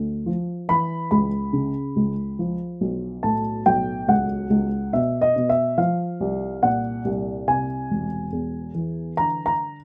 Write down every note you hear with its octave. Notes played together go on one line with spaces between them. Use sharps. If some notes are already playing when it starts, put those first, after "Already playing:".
Already playing: D2
F3
E3 B5
C#2 B5
C#3
C#2
F3
B1
A2 A5
B1 G5
C#2 F#5
C#2
B2 E5
D#5
B2
E5
F3 F5
C2
A#2 F#5
C2
C3 G#5
E1
E2
E3
D3 A#5
A#5